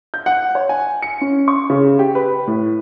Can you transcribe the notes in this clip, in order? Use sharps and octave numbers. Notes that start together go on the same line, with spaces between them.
G6
F#5
C#5
G#5
C#7
C#4
C#6
C#3
G4
B4
A2